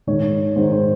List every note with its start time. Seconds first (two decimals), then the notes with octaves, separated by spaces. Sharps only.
0.07 G#2 D#3 C#5
0.56 G#2 D#3 C5
0.72 C5